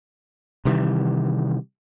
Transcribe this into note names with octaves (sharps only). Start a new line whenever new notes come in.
C3 D#3 E3 G3